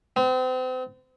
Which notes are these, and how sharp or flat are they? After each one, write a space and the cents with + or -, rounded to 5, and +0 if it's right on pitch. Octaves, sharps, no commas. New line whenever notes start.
C4 -35